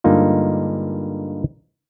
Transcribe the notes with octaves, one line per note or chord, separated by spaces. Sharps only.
G2 D3 G#3 A#3 D#4 F4